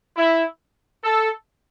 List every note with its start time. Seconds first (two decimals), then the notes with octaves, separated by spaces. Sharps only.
0.16 E4
1.03 A4